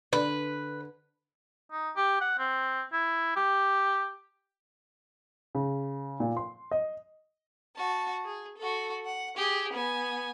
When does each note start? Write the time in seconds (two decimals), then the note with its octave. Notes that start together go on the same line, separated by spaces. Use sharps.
0.13 D3 B4
1.72 D#4
1.96 G4
2.21 F#5
2.38 C4
2.92 E4
3.36 G4
5.55 C#3
6.20 A#2
6.37 C6
6.71 D#5
7.76 F#4 A5
8.25 G#4
8.58 F#4 A4
9.06 F#5
9.36 G4 G#4
9.73 B3 G#5